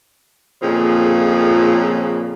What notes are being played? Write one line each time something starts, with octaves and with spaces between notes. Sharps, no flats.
F2 A#2 C#3 F3 G#4